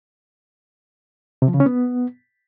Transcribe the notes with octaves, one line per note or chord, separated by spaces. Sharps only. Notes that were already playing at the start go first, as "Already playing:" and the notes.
C3
F3
C#3
C#4
B3